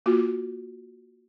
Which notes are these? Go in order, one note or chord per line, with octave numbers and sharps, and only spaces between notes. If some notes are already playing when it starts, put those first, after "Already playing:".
A#3 F4 F#4